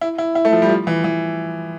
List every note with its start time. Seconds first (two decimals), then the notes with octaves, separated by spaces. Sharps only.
0.01 E4
0.18 E4
0.35 E4
0.45 A3
0.53 F3
0.62 G3
0.69 F3
0.87 E3
1.04 E3